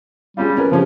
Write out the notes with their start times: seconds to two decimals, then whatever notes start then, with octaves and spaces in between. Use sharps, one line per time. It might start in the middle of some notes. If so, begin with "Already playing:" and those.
0.37 G3 G#3 C#4 F4
0.57 C#4 A#4 B4
0.71 C#3 F3 C#4 G4